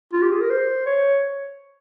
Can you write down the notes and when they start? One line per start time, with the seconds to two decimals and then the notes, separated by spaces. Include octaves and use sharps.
0.13 F4
0.22 G4
0.31 G#4
0.41 A#4
0.50 C5
0.86 C#5